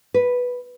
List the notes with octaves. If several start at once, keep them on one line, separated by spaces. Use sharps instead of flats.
B4